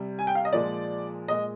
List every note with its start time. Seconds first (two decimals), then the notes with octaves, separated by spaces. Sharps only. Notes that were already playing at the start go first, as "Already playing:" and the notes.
Already playing: C3 G3
0.19 G#5
0.27 G5
0.35 F5
0.45 D#5
0.53 A#2 F3 G#3 D5
1.28 A#2 G#3 D#5